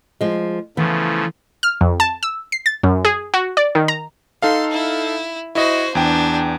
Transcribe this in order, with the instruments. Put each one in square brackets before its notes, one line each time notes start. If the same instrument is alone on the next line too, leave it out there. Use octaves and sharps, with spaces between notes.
[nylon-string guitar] F3 G#3
[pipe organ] C#3 F3 A3 [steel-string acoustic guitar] E3 [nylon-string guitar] B3
[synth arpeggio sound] F6
F2
A5
E6
C7
A6
F#2
G#4
F#4
D5
D#3
A#5
[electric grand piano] D#4 A4 F5 [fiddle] C6
[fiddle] E4
[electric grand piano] E4 D#5 [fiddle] F#4 C5
[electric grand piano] E2 G5 [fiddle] D4